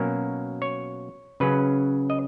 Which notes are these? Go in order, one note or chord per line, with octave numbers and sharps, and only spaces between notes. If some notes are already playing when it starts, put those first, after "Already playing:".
Already playing: B2 F#3 A#3 C#4 A#4
C#5
C#3 F#3 C#4 B4
D#5